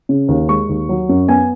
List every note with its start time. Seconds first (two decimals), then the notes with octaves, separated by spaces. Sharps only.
0.09 C#3
0.28 D#2
0.49 G#3 C#6
0.69 D#2
0.89 F#3
1.09 F#2
1.28 B3 G#5